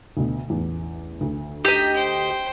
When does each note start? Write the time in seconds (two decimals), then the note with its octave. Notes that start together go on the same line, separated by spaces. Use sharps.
0.17 D2 B2
0.50 A1 E2
1.21 D2
1.65 D#4 G4 D#5 B6
1.95 C5 G5